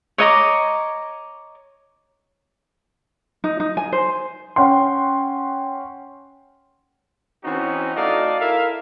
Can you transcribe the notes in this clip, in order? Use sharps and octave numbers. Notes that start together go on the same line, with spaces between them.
C#5 D#5 A#5 D6
D#4
D#4
G#5
C5
C#4 F#5 G5 C6
E3 C4 C#4 D#4 F#4
A3 D#4 F#4 D5 D#5 F5
E4 A4 A#4 E5 F5